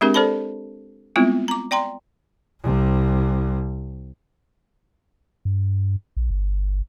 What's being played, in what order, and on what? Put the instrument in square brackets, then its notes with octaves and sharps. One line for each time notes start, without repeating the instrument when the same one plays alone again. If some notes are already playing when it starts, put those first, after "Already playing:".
[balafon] G#3 C4 D4 G4 G#4 A#4
A4 C5 D5 A5 B5
G3 G#3 B3 C4 E4 F4
A#5 D6
D5 G5 A#5 C6
[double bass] C2 C3
[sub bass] G2
A#1
G1